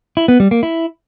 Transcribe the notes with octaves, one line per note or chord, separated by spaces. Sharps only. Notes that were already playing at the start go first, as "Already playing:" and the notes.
E4
B3
G3
A#3
E4